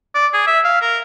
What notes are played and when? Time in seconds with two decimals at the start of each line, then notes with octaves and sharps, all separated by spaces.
0.15 D5
0.34 G#4
0.47 E5
0.65 F5
0.82 A#4